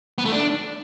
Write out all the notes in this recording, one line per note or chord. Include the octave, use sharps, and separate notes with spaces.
B3
A3
D4